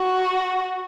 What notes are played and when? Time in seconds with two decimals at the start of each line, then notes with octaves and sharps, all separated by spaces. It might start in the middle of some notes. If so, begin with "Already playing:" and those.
Already playing: F#4